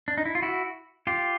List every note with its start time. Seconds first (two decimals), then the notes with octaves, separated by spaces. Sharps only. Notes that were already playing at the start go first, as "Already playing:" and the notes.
0.08 D4
0.18 D#4
0.25 E4
0.35 F4
0.42 E4 F#4
1.07 F4 G4